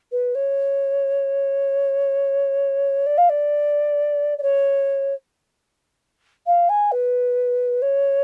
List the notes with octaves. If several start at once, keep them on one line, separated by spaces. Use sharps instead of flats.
B4
C#5
D5
F5
D5
D5
C#5
F5
G#5
B4
C#5